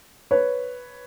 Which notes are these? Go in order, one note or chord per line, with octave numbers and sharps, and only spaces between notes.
B4 C#5